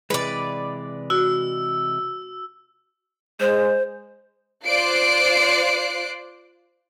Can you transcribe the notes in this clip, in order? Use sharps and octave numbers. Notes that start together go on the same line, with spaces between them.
C3 E3 G#3 B4 D5
F#4 E6
G#3 C5
F4 C5 D5 F#6 C7 D7